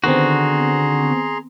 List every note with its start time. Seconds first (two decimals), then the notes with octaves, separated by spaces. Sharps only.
0.04 D3 D#3 B3 C4 F#4 G#4 A#5 C6